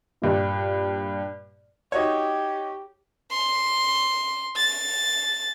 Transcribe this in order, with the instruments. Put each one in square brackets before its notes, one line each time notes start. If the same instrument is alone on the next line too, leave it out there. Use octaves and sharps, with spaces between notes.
[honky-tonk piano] G2 A#2
[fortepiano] D#4 F#4 C#5 [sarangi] G4
[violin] C6
A6